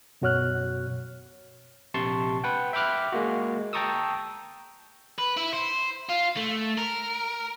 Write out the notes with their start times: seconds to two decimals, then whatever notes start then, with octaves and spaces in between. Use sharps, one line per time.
0.22 F#2 B2 F#4 C#5 F6 F#6
1.94 A#1 C3 A5 C6 C#6
2.44 B4 F#5 G5
2.73 E5 G5 B5 D6 F6 F#6
3.12 G#3 A#3 F#4
3.73 G5 A5 A#5 C#6 D#6 E6
5.18 B4
5.37 E4
5.53 C5
6.09 F4
6.37 A3
6.78 A#4